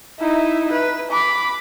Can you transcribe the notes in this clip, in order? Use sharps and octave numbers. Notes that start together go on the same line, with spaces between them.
D#4 E4
B4
B5 D6